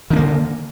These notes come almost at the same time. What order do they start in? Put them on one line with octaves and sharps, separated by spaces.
D#3 C#4 A#3 D3